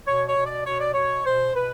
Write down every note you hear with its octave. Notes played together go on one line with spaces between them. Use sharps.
B2 C#5
C#5
B2
D5
B2 C#5
D5
B2 C#5
B2 C5
B2 B4